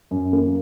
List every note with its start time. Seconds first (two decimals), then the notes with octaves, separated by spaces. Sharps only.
0.11 F#2
0.33 A#3